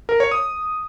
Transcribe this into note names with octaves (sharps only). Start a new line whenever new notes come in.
A#4
C#5
D#6